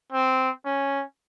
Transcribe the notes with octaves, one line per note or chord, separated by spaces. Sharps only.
C4
C#4